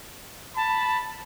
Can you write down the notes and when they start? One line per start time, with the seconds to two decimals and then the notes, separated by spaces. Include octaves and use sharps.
0.56 A5 B5